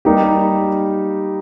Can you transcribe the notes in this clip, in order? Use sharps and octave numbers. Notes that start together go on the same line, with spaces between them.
G3 A#3 D#4 G4